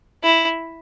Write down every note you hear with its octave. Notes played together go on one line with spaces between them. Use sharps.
E4